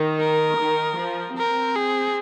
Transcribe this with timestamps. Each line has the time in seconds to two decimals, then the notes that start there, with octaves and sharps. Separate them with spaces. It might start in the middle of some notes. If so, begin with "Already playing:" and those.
Already playing: D#3
0.20 A#4
0.59 D#3
0.98 F3
1.37 C4 A#4
1.76 G#4